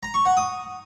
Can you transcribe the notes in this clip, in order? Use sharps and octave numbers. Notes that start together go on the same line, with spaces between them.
A#5
C#6
F#5
D#6